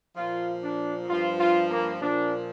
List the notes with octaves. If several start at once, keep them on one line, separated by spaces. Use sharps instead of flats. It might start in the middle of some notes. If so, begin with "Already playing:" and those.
A#2 F3 F4
D4
G2 F3 F4
F4
A#3
A#2 F3 D4